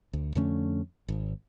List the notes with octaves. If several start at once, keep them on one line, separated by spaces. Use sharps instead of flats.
D2
F2 D3 A3 C#4
G#1